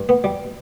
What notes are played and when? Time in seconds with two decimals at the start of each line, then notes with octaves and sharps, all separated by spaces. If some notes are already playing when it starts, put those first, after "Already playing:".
Already playing: G2
0.09 B3
0.24 G3